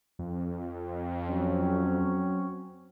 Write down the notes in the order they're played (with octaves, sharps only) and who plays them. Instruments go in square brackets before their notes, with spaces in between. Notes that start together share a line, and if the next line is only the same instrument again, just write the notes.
[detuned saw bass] F2
[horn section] F#3 C4 C#4